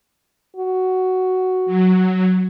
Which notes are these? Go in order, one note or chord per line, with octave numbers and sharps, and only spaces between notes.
F#4
F#3